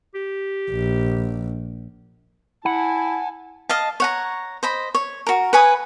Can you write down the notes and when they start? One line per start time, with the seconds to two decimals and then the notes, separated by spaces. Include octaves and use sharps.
0.15 G4
0.70 A#1
2.65 E4 F#5 G#5 A5
3.69 D#5 F5 A5
4.00 C#5 F#5 A#5
4.63 C5 D#5 B5
4.95 C#5
5.27 F#4 A#4
5.53 B4 C#5 G#5 D#6